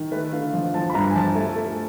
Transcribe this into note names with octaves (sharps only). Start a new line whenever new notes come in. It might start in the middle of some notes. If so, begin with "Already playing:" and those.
Already playing: D#3
A3 B4
D3 F5
F3 F5
F3 A5
B5
G2 A#5
G#5
F3 A5
A3
A3